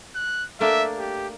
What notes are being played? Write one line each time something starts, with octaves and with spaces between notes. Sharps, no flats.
F#6
A3 A#3 D4 E5
G4